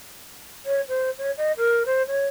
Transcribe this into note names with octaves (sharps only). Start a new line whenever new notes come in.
C#5
C5
C#5
D#5
A#4
C5
C#5